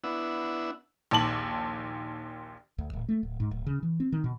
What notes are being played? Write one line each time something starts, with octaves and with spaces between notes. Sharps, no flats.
B3 D4 E4 F#5 E6
A#1 D#2 A5 F#7
D2
D1
A3
D1
G#2
D1
C#3
E3
C4
D#3
B2